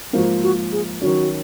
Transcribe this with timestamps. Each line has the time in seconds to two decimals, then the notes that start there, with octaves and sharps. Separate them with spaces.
0.13 G#2 F3 A#3 F4 F#4 C5
0.43 F#4
0.72 G#4
1.01 D#3 F#3 C#4 F#4